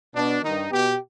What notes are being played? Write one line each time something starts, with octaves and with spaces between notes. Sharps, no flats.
B2 D4
G2 D#3 D#4
B2 G4